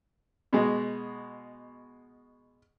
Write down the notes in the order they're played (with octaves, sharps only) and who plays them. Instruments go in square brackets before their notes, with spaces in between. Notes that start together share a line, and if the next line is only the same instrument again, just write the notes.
[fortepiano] B2 G#3